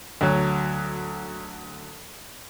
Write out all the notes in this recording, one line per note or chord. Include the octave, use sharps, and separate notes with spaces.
D2 F#3